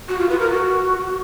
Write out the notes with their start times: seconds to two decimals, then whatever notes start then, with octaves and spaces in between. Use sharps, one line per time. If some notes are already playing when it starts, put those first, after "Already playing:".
0.09 F#4
0.19 F4
0.29 B4
0.40 A#4
0.50 F#4